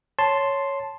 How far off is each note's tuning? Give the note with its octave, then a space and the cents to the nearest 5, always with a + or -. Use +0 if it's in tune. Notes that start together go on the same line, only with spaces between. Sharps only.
C#5 +0 A5 +0 C6 +0